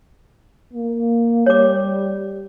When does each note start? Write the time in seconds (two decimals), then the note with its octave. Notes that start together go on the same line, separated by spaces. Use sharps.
0.73 A#3
1.46 G3 C#5 D6